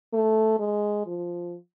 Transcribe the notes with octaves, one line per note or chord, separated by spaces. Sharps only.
A3
G#3
F3